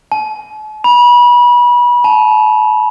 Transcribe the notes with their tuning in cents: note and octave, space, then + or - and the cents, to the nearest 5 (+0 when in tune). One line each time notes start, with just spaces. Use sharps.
A5 -45
B5 -30
A5 -35